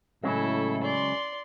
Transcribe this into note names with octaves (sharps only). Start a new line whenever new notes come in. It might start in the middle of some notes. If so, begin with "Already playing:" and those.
A2 C#3 F#3 G#3 C#4 E4 A4
D5 C6